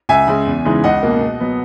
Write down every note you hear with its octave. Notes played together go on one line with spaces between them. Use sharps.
C#2 E5 G#5
C#3 G#3
E2
C#3 E3 G#3 D#4
C#2 D#5 F#5
B2 A#3
B2
F#3 B3